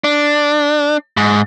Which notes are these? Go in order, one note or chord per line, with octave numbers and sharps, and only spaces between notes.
D4
G#2